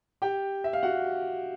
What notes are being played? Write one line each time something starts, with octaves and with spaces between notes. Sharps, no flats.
G4 G5
E5
F5
F#4 F#5